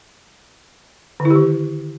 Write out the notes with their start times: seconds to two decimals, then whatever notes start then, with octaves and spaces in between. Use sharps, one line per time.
1.20 D3
1.25 E4
1.30 G4
1.36 D#3